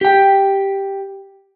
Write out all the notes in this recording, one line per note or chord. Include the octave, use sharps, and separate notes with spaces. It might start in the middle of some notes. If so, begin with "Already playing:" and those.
G4 G5